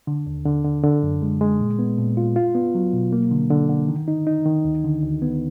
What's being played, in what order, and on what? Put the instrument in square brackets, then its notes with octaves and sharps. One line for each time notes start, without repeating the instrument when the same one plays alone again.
[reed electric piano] D3
D#2
D3
D3
D3
F#2
G#3
G#3
A#2
B3
A#2
F4
F4
B3
F#3
B2
A#3
D3
D3
D3
D#3
D#4
D#4
D#3
D2
D3
D2
B3